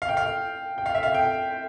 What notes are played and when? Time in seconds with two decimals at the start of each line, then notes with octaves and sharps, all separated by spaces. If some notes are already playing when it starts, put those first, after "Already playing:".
0.02 F5
0.09 G5
0.17 F5
0.78 G5
0.86 F5
0.95 E5
1.03 F5
1.15 G5